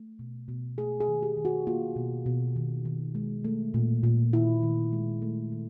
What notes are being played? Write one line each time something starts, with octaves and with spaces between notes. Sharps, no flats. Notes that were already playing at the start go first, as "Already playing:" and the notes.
Already playing: A3
B2
B2
A3 G#4
G#4
D#3
G4
D#3
F#4
A#3 F4
B2
B2
D#3
D#3
G#3
A3
A#2
A#2
D#3 E4
D#3
G#3
A3
D#3